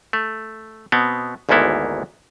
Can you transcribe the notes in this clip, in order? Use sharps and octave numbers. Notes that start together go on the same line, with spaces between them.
A3
B2 B3 C4
G#1 D2 G#2 A#3 B3 E4